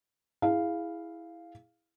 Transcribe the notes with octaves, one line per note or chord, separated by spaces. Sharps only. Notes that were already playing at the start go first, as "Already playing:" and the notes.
E4 G#4 F5